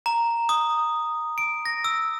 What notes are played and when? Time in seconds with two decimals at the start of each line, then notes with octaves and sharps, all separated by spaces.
0.06 A#5
0.49 D#6
1.38 D7
1.65 A#6
1.84 E6